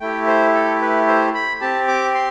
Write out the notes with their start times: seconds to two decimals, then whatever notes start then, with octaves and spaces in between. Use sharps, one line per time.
0.01 A3 E4 G4 G5
0.27 C5
0.54 A4
0.81 B4
1.08 C5
1.34 B5
1.61 C4 G4 A5
1.88 D6
2.14 C6